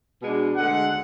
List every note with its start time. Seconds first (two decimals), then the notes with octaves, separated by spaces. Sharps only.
0.20 B2 G#3 D4
0.56 D2 D3 G#3 F#5